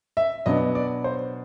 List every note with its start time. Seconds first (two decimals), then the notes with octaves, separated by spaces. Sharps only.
0.17 E5
0.46 B2 F#3 B3 D4 D#5
0.75 D5
1.04 C5